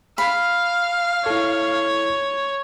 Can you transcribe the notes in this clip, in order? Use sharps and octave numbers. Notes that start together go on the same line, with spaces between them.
F5 B5
E4 A4 C#5